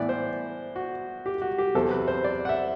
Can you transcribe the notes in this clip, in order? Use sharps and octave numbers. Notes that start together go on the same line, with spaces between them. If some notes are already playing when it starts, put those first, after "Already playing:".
Already playing: A2 E3 B3 E4 D5
C5
F#4
G4
F#4
G4
E2 C3 F#3 C4 E4 A4
B4
C5
D5
F#5
E5